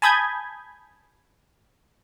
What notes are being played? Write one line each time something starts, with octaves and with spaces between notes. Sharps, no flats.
G#5 A5 B5 D#6 G6 G#6